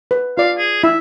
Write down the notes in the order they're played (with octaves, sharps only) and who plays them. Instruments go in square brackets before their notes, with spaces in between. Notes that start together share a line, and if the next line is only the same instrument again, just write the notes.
[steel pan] B4
[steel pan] F4 D5 [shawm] F5
[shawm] G#4
[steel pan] E4 [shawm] E5